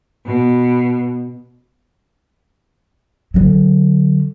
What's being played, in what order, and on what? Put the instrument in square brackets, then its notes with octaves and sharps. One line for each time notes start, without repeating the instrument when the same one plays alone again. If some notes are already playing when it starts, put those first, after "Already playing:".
[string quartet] B2
[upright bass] D3 F#3